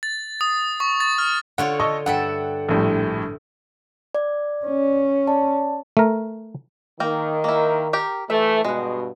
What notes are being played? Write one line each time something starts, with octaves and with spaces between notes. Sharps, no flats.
A6
D#6
C#6
A6
F6
D3 F4 C#5 F#5
A4 D#5 C#6
G2 A4 E5 F#5 G5
A#1 A2 G3
D5
C#4
D5 A5
A3 A#4
D#3 A#3 A#4 G5
A#3 E4
G4 A#4 G5
E3 A3 E5
G2 B2 G#3 F#5